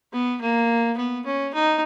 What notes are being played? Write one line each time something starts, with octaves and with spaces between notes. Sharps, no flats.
B3
A#3
B3
C#4
D#4